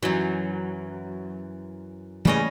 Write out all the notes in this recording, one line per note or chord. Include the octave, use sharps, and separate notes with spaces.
F#2 E3 F#3
E2 C#3 E3 G3 A3 A#3 C#4 D#5